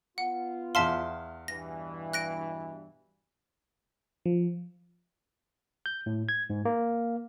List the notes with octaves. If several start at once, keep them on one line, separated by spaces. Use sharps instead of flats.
B3 F4 F#5
E2 E5 F5 A5 C6
G2 B2 E3 A#6
F#6 A#6 D7
F3
G6
A2
G#6
G#2
A#3